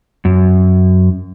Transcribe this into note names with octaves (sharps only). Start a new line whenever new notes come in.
F#2